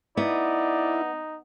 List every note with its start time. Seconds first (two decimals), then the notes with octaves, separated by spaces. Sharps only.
0.17 B3 D#4 E4 D5